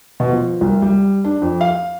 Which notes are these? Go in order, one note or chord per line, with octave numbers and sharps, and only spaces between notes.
B2
F3
C2
G3
D4
F2
F5